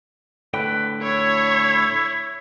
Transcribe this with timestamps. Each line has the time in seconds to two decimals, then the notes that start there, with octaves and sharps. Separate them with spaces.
0.54 A2 D3 B4 G5
1.03 E4 C#5